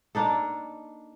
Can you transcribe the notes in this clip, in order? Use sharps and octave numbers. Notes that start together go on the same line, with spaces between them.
A#3 D4 D#4 A4